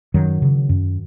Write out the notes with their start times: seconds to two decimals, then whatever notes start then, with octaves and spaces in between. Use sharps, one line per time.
0.14 F#2 D#3 F#3
0.42 C#3
0.69 F#2